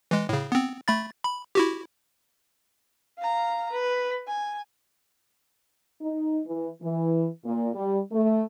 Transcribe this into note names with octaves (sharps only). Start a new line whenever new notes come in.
E3 G#3
A2 C#3
B3 C4
A3 B5 A6
B5
E4 F#4 G4
F5 A#5
B4
G#5
D#4
E3
E3
A#2
G3
A3